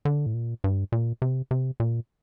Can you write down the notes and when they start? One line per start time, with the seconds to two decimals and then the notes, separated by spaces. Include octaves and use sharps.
0.05 D3
0.26 A2
0.34 A#2
0.64 G2
0.92 A#2
1.22 C3
1.51 C3
1.80 A#2